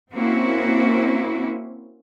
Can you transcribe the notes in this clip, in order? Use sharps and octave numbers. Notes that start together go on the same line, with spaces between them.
A#3 C4 C#4 E4 F#4 C5